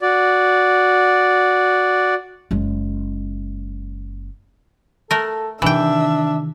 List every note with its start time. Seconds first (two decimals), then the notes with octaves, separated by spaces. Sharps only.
0.01 F#4 D5
2.51 F#1 G#3
5.11 A3 A4 A#4
5.62 C3 D#3 E3 D4 E5 G5